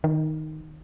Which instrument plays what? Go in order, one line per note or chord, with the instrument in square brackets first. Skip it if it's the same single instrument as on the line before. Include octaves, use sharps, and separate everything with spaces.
[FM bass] D#3